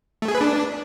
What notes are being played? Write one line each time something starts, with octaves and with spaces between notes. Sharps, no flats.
A3
G#4
B4
D4